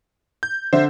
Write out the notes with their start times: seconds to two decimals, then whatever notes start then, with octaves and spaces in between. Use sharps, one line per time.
0.43 G6
0.73 D3 C5 E5